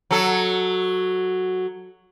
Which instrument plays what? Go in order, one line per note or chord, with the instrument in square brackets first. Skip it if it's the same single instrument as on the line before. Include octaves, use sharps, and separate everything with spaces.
[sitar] F#3 A4